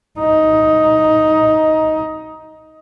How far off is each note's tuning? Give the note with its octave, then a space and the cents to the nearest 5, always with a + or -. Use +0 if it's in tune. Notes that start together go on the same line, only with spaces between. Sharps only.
D#4 +10